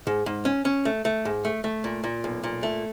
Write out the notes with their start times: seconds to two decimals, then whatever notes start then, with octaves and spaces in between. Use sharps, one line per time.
0.07 G#2
0.26 G#2
0.45 C#4
0.65 C#4
0.85 A3
1.05 A3
1.25 G#2
1.45 A3
1.64 A3
1.84 A#2
2.04 A#2
2.24 B1
2.44 A#2
2.63 A3